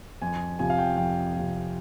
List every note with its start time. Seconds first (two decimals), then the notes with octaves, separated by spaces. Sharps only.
0.22 F2 G#5
0.59 C3 F3 G#5
0.70 F5
0.78 G5
0.97 F2 G5
1.35 C3 F3